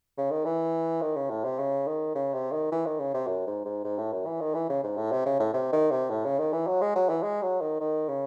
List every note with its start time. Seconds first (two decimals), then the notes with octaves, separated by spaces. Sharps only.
0.18 C#3
0.31 D#3
0.45 E3
1.02 D#3
1.16 C#3
1.30 A2
1.45 C3
1.59 C#3
1.87 D#3
2.15 C#3
2.34 C3
2.52 D#3
2.72 E3
2.86 D#3
3.00 C#3
3.14 C3
3.27 F#2
3.47 G#2
3.65 G#2
3.84 G#2
3.98 A2
4.13 F#2
4.26 E3
4.41 D#3
4.55 E3
4.69 C#3
4.84 G#2
4.97 A2
5.12 C3
5.26 C#3
5.40 A2
5.54 C3
5.73 D#3
5.91 C3
6.10 A2
6.25 C#3
6.39 D#3
6.53 E3
6.67 F#3
6.82 G#3
6.96 F#3
7.09 E3
7.23 G#3
7.42 F#3
7.61 D#3
7.80 D#3
8.09 C#3